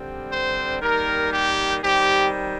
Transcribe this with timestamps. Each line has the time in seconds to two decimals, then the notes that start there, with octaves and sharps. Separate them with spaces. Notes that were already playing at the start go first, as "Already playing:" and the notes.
Already playing: G2 D3 G3 C4
0.30 C5
0.81 D#3 G3 A#3 A#4
1.31 G4
1.82 D#3 G3 C4 G4